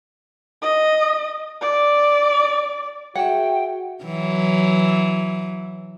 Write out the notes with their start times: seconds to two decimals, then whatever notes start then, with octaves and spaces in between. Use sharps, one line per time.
0.62 D#5
1.61 D5
3.16 F#4 G#4 E5 F#5 G5
4.04 E3 F#3